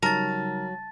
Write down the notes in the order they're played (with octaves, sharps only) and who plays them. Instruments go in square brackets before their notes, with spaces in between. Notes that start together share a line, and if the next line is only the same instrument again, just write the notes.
[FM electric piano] C#3 G3 D#4 [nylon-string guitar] F#3 [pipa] A#4 [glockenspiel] A5 A6